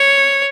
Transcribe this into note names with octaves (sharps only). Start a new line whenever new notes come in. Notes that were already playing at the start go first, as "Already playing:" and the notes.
Already playing: C#5